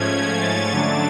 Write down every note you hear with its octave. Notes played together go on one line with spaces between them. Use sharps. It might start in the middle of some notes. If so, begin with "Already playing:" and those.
Already playing: G#2 F3 A3 C#4 G#6
G#6
A6
D3 F#3 A3 D4